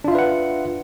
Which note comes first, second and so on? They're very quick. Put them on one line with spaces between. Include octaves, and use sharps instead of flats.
D4 F4 E5 B4 F#5